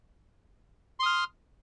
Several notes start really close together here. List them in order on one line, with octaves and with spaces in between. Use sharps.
C6 D#6 F6